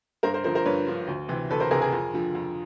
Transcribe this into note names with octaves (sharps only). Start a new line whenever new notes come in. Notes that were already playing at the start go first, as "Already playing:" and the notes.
G2 A#4 C5
A#4 C5
D3 F3 A#4 C5
A#4 C5
G2 B4 C#5
D3 F3
D2
C3 E3
D2 A4 B4
A#4 C5
C3 E3 G#4 A#4
G#4 A#4
F2
D3 F3
F2